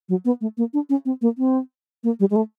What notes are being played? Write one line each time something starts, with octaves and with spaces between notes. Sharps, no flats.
F#3
B3
A3
A#3
D4
C#4
C4
A#3
C4
A#3
G3
G#3
A3